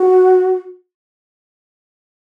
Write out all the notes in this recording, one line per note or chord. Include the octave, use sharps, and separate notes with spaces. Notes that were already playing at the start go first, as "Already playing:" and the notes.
Already playing: F#4